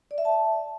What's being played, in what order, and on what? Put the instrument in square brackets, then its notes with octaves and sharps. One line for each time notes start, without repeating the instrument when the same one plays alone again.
[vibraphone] D5
E5
A5